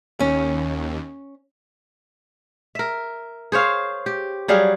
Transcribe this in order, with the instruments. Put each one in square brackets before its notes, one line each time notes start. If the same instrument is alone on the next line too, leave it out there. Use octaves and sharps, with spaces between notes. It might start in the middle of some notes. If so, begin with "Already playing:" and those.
[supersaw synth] D#2 [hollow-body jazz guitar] C#4
[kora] A#4 E5
G#4 C5 C#5 F5
G4
F#3 G3 G#4 F5